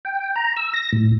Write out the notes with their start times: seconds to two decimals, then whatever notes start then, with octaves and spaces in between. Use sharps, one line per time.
0.05 G5
0.36 A#5
0.57 E6
0.73 A#6
0.93 A2